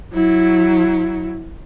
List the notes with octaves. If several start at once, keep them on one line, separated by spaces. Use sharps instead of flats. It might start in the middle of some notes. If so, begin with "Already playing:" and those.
F#3 E4